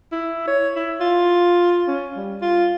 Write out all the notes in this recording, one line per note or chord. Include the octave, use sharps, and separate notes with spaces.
E4
C#5
E4
F4
C#4
G3
F4